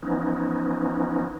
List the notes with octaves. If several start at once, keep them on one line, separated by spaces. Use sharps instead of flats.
E3 F3 B3 C#4 D#4